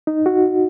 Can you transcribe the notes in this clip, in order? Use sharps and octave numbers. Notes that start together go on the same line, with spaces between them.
D#4
F#4